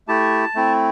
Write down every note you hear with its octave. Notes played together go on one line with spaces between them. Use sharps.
A3 E4 G4 A5
A3 C4 E4